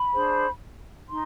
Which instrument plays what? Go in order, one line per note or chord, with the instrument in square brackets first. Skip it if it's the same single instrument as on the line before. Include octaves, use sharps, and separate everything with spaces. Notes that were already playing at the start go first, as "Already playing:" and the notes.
Already playing: [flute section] B5
D4 G#4 C5
D#4 C6